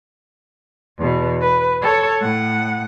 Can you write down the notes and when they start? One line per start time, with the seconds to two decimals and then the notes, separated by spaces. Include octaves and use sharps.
0.98 E2 B2
1.41 B4
1.82 A4 C#5
2.21 A2 F#5